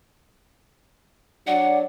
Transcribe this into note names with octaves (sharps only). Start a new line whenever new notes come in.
F#3 D4 D5 F#5